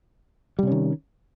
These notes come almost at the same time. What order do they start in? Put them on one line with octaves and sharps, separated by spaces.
G3 C3 C#4 D#3